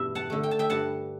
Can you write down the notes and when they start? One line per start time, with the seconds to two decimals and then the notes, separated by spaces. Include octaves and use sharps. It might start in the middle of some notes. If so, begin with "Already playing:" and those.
Already playing: E2 G2 B2 E5
0.15 F#5 A5
0.30 D3 A3
0.43 G5
0.51 A5
0.59 E5 G5
0.70 G2 F#5 A5